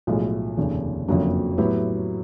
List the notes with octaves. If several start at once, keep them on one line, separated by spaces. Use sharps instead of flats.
B1 A2 F3 G#3
F1 D#2 C#3
F#1 F2 D3 F#3 A#3
A2 F#3 B3 E4 G4